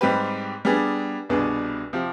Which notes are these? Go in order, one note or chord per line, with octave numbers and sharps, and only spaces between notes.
G#2 G3 C4 G4 B4
G3 B3 D4 G#4
C2 B2 B3 D4 G#4
C3 F3 C4 G4